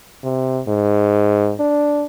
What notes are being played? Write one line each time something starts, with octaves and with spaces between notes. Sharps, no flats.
C3
G#2
D4